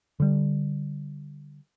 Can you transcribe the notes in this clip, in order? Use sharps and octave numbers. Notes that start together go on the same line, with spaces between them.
D3 G3